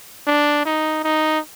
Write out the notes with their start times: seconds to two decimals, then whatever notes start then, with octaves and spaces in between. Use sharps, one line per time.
0.27 D4
0.65 D#4
1.04 D#4